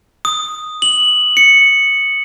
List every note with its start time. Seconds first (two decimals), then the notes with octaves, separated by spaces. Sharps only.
0.25 D#6
0.82 F#7
1.37 C#7